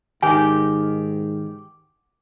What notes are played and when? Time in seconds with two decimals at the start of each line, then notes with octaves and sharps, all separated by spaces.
0.23 G#2 D#3 G4 G#5